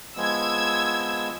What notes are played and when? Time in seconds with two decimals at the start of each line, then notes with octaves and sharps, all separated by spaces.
0.17 F3 G#3 B3 E6 G#6